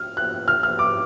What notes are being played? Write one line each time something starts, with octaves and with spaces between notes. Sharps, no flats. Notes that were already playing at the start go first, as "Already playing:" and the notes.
Already playing: F6
F#6
F6
F6
D6